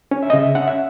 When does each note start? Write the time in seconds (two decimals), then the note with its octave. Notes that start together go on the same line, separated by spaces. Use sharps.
0.11 C#4
0.23 E5
0.30 C#3 D#5
0.39 E5
0.55 C#4 F#5
0.68 E5